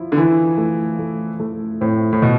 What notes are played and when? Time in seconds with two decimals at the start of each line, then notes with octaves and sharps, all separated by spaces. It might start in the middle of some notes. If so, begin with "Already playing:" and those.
Already playing: F3 E4
0.12 D3
0.17 E3 E4
0.58 A3
0.99 A3
1.40 A3
1.81 A2 C4
2.13 A2
2.21 B2 A3